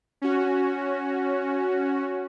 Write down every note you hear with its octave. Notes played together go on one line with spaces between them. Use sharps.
C#4 F#4